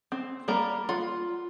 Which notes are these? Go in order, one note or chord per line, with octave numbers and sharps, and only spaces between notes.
C4
G3 A#3 A#4 A#5
F4 F#5